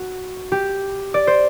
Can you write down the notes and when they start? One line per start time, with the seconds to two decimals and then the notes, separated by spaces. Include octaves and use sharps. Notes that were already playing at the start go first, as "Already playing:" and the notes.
Already playing: F#4
0.52 G4
1.14 D5
1.27 C5